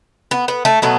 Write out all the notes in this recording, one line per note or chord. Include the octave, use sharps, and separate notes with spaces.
B3
B3
A3
B2 F#3 A3 B3